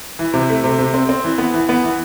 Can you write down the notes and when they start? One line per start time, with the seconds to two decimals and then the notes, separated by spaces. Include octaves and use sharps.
0.19 E3
0.34 C3
0.49 A3
0.64 C3
0.79 C3
0.94 C4
1.09 C4
1.24 E3
1.38 B3
1.54 E3
1.69 B3
1.84 E3